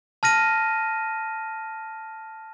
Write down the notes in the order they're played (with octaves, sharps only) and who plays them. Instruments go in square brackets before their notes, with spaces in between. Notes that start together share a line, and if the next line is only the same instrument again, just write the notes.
[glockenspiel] A5 F6 A#6 D#7